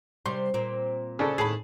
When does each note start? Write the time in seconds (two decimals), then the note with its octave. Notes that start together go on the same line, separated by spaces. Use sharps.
0.26 C3 G3 C6
0.54 A#2 C4
1.19 C#3 D4 A4
1.38 D#2 A2 G#4 A5 B5